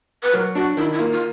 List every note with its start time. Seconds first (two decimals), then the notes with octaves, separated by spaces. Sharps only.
0.23 B4
0.34 F#3 A#4
0.55 D4 F#4
0.77 D#3 E4
0.93 E4
0.99 A#3 F4
1.12 F4